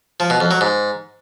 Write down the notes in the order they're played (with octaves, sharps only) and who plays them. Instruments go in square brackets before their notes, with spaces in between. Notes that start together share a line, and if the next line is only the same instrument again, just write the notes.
[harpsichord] F3
B2
F2
F#3
G#2